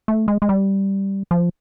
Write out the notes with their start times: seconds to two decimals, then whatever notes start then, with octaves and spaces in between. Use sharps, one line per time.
0.08 A3
0.28 G#3
0.42 G#3
0.49 G3
1.31 F3